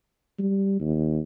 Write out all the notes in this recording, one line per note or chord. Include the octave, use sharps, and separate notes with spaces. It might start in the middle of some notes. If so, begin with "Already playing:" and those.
G3
D#2